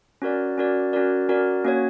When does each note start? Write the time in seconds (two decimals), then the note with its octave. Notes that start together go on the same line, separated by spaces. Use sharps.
0.22 C#4 F#4 A#4 D5
0.58 C#4 F#4 A#4 D5
0.93 C#4 F#4 A#4 D5
1.29 C#4 F#4 A#4 D5
1.65 A#3 C#4 F#4 C#5